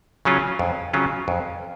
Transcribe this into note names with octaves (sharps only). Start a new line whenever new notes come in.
C#3 F#3 C#4 F4
F2
C#3 F#3 C#4 F4
F2